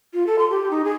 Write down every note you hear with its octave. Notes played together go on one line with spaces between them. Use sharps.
F4
A4
C6
G4
D#4
G#4